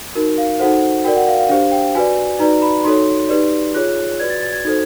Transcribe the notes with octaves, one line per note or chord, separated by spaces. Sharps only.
D#4 F#4 A#4
F5
D#4 F#4 A4 C5 F#5
F#4 A#4 D5 G5
F#5
F5
F5
D4 G4 C5 F5
G5
F#4 B4 D5 G#5
D#4 F#4 B4 D5 A#5
B5
D#4 F#4 A4 C#5 C6
D#4 G4 B4 D5
F4 G#4 C#5 F#6
F#4 B4 D5 G#6
A6
A6
G#6
D#4 F#4 A4 C5 G#6